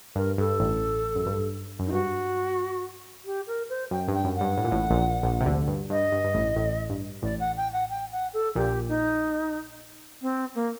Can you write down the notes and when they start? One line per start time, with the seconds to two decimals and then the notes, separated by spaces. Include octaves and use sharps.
0.15 G2 A#4
0.38 G2 A4
0.60 A1 A2
1.15 F#2
1.26 G2
1.79 F#2
1.87 D#4
1.92 G2 F#4
3.25 G4
3.47 A#4
3.69 C5
3.91 F#2 G5
4.08 G2
4.13 G5
4.24 F#2
4.35 F#5
4.41 G2
4.57 A2
4.64 A#2
4.71 A1 A2
4.91 A#1 A#2
5.23 A#1 A#2
5.40 C3
5.46 D2 D3
5.68 G2
5.90 G2 D#5
6.12 G2
6.24 G2
6.34 A1 A2
6.56 A1 A2
6.89 G2
7.22 A1 A2 D5
7.39 F#5
7.56 G5
7.72 F#5
7.89 G5
8.12 F#5
8.33 A4
8.55 A#1 A#2 G4
8.88 D#4
10.21 C4
10.54 A#3